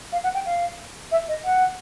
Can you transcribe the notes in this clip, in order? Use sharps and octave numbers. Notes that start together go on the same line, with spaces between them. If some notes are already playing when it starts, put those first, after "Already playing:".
F5
F#5
G5
F5
E5
D#5
F#5